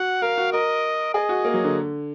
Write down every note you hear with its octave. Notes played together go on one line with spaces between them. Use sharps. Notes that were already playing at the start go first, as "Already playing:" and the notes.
Already playing: F#4 F#5
A#4 F5
F#4
A#4 D#5
G#4 D#5
F#4
A#3
F#3
D3